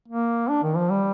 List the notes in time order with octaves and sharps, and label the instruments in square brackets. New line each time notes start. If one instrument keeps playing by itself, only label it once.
[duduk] A#3
D4
D#3
F3
G3